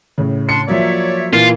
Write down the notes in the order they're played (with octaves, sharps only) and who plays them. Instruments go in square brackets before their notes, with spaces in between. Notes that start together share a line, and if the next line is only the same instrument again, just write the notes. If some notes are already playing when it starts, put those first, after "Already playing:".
[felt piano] A2 C#3
[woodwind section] D4 C6 [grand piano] C#7
[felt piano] F3 F#3 A#3 [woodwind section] C#5 D5 E5
[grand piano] A#2 E3 [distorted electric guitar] F4